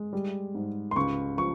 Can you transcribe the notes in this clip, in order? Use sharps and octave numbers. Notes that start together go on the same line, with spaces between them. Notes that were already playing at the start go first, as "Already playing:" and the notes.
Already playing: G#3
G3
G#2
C6
C#2 C#6
F3 C#6